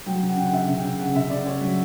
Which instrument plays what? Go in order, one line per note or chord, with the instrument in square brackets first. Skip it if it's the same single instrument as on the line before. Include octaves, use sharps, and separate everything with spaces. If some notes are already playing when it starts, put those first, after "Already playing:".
[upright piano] F#3 G5
C#3
F#5
C#3 G5
F#5
C#3 E5
C#3
G5
C#3
C#3 F#5
C#3 E5
C#3 D5
C#3 C#5
F#3